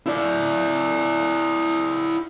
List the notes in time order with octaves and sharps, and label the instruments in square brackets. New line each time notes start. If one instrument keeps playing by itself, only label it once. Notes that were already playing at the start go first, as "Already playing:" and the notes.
[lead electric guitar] E4 D5